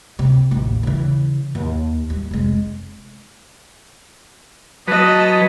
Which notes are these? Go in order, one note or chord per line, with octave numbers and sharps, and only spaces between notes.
C3
A1 D#2
C#3 E3
D#2
G3
F1 G#3
F#3 B4 D#5 A5